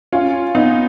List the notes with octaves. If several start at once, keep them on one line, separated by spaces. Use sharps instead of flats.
C#4 F4
B3 D#4